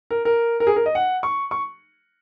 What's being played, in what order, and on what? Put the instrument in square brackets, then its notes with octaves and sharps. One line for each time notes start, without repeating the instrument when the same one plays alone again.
[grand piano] A#4
A#4
A#4
G#4
A#4
D#5
F#5
C#6
C#6